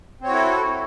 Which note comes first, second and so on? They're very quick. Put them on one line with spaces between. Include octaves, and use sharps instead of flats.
C4 C#5 F#4 E4 A4